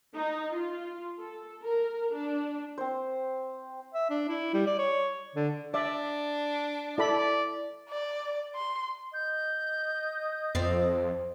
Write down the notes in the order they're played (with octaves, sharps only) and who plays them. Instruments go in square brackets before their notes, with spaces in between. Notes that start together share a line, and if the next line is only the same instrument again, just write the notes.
[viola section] D#4
F4
A4
A#4
D4
[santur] C4 C5
[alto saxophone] E5
D4
E4
G3
D5
C#5
D3
[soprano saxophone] D4 [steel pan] D5 E5
[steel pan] E4 A4 B5 [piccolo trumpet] D5
[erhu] D5
C6
[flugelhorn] D#5 [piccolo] G6
[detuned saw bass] F2 [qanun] C4 D5 F5